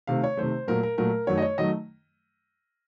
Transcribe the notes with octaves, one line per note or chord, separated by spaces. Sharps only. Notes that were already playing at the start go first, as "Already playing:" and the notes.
C3 D#3 A3 F5
C#5
C3 D#3 A3 C5
A#2 F#3 A3 A#4
A#4
A#2 F#3 A3 A#4
F#2 D#3 F#3 A3 C#5
D#5
C#5
D#3 F#3 A3 D#5